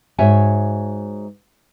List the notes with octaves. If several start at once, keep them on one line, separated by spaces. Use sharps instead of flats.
G#2 F#4 C#5 E5 G#5